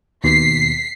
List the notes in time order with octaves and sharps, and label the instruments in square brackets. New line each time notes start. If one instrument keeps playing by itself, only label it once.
[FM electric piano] D#2 B2 [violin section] B6 C7